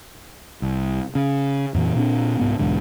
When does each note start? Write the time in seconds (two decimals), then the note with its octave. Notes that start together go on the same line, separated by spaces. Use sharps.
0.62 C2
1.15 C#3
1.74 F2 A#2 E3
1.95 A#2 C4 D4
2.39 C2 G#2 B3
2.59 B1 E2 G#2 D3